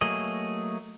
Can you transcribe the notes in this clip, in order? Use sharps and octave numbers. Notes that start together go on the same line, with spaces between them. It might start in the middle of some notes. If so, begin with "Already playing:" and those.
F#3 A3 A#3 G#4 D#5